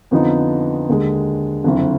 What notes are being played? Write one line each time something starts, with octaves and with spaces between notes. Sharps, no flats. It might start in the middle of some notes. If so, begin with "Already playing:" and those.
F2 D3 F3 B3 D#4
D#2 D3 G#3
F#1 F2 D3